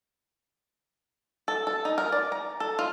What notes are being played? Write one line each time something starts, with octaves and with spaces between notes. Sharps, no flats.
A4
A4
D#4
A#4
D5
A#5
A4
F4